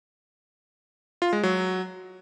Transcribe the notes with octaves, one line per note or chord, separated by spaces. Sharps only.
F4
G#3
F#3